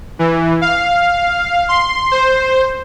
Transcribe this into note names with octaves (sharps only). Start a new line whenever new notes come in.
E3
F5
C6
C5